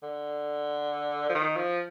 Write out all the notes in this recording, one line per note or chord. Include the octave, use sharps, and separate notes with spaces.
D3
F3
D#3
F3